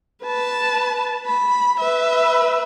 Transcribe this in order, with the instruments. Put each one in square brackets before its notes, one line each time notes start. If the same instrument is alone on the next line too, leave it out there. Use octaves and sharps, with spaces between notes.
[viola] B4 A5
B5
B4 E5